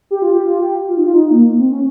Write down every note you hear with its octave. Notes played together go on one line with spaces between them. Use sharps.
G4
F4
G4
F4
G4
F4
D#4
F4
D#4
A#3
A#3
C4
C#4